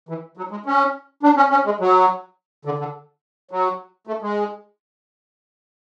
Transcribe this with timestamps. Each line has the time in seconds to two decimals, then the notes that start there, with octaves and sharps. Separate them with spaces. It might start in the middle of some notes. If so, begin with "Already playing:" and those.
0.09 E3
0.37 F#3
0.51 G#3
0.66 C#4
1.23 D4
1.37 C#4
1.51 C#4
1.65 G#3
1.80 F#3
2.65 D3
2.79 D3
3.51 F#3
4.07 A3
4.22 G#3